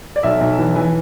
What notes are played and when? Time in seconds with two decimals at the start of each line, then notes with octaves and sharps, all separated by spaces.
0.16 D5
0.23 B1 E5
0.40 B1
0.58 E3
0.75 E3 G#5